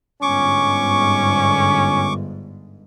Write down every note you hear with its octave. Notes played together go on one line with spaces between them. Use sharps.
G1 G#2 C#4 C#6 D6